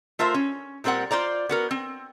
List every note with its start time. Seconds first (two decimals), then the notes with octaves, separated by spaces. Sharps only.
0.19 A3 F4 A#4 C5 E5
0.34 C#4
0.84 A#2 G3 C4 A#4 F#5
1.11 F4 C5 D5 A#5
1.49 B3 F#4 A#4
1.71 C4